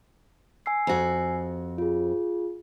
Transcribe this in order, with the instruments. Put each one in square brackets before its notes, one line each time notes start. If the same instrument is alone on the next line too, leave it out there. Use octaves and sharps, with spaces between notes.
[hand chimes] G#5 E6 C7
[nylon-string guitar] F2 F#4
[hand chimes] F4 G#4